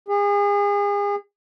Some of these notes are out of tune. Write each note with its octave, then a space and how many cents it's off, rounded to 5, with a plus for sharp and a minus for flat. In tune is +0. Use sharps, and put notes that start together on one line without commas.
G#4 -35